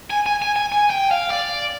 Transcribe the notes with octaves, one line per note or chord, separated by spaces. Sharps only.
G#5
G#5
G#5
G#5
G#5
G5
F5
D5